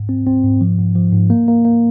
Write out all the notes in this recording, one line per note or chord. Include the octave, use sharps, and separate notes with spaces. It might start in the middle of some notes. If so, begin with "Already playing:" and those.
Already playing: G#2
C4
C4
G#2
F3
G#2
F3
G#2
A#3
A#3
A#3